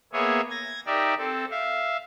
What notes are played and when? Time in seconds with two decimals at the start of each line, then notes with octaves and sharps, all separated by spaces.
0.13 A#3 B3 G#4 C#5 E5
0.50 G#6 A#6
0.86 D#4 G4 A#4 D5 E5
1.18 C4 A4
1.51 E5 F5